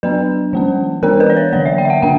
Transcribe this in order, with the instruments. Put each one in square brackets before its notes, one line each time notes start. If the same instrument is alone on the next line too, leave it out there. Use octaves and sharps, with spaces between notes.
[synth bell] F#3 B3 D4 B4
E3 A#3 C#4
E3 B3 D4 A#4
B4
D5
C#5
D3 F#3 A#3 D5
E5
G5
E5
F#5
D3 A#3 D4 G5